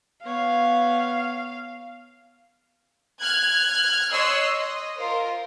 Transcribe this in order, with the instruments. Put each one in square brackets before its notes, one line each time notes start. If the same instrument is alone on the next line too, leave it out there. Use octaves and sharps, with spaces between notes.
[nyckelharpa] B3 C#5 [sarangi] F5
[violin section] F6 F#6 G#6
C#5 D#5 C6 E6 F#6
D#5
F4 A#4 C5